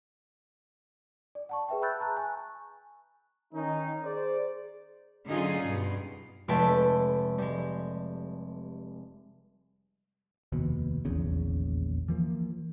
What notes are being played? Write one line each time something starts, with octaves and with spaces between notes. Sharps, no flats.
D5
F#5 A5 C#6
G#4 B4 E5 G5
B5 C#6 E6 F#6 G6 A6
A5 A#5 F#6
G#5 C#6
D#3 C#4 D#4
G#4 C5 D5
D3 F#3 C#4 D#4 F4 G#4
G2 B2
F1 G#3 A3 B4 G5 A5
G3 G#3
F1 D#2 B2
D#1 A#1 E2 C#3
E3 F3 A#3